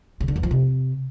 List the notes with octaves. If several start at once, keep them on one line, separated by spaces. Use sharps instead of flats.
C#3
D3
E2
F3
C3